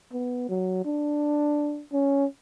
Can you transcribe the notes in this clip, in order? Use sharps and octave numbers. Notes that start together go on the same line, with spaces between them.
B3
F#3
D4
C#4